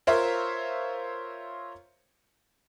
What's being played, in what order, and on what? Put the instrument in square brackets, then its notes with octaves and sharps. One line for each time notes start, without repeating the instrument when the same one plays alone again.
[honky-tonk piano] F4 A#4 C5 C#5 E5 F5